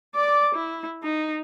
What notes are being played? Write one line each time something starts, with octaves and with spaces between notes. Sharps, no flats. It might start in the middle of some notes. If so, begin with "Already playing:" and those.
D5 D6
E4
D#4